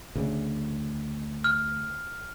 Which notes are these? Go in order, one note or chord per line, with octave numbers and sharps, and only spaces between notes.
D2 C#3
F6